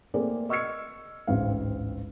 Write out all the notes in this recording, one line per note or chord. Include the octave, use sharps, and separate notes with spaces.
A3 A#3 C4 G#4 D5
D#5 C#6 E6 F6 G#6 C#7
A1 D2 G#2 C4 F5